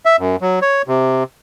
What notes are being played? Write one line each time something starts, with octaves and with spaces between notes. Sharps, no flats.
E5
F#2
F#3
C#5
C3